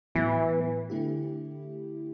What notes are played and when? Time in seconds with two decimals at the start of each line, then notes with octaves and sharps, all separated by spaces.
0.15 A2 E3 F#3 B3
0.90 D3 A3 E4 G4